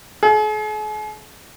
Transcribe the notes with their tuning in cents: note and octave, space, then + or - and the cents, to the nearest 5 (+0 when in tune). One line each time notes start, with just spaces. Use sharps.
G#4 +45